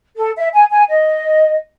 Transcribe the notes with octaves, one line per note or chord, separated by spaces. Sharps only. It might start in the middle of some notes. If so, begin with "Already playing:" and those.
A4
E5
G#5
G#5
D#5